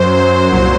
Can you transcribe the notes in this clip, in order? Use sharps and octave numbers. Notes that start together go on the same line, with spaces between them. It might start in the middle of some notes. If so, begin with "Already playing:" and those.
Already playing: F#2 F#3 C5
C2 A#2 F#3